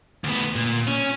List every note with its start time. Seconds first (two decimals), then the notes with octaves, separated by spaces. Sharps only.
0.24 D2 B3
0.56 A#2
0.87 C#4